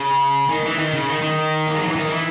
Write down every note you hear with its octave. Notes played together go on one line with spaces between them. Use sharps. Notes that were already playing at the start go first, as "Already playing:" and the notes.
Already playing: C#3
D#3
E3
D#3
C#3
D#3
D#3
A#3
G#3
F#3
E3
D#3
E3